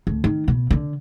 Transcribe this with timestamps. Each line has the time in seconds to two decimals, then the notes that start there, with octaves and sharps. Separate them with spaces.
0.07 D2
0.24 D#3
0.48 B2
0.71 D3